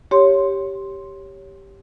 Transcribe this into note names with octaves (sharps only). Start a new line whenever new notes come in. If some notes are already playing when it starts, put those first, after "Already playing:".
G4 C#5 C6